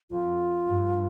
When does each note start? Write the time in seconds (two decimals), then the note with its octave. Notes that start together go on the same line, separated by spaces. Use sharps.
0.11 F2 F4
0.67 G2